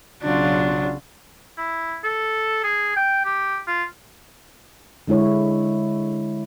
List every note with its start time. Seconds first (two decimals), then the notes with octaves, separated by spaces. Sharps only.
0.23 B1 C#3 F#3 D4 F4
1.58 E4
2.04 A4
2.64 G#4
2.96 G5
3.25 G4
3.67 F4
5.08 D3 G#3 E4 C#5